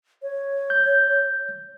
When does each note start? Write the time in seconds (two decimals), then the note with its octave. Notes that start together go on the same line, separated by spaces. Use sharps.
0.22 C#5
0.70 G6